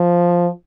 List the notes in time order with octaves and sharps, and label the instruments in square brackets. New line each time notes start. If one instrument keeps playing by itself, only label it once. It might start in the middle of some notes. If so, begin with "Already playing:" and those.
Already playing: [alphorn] F3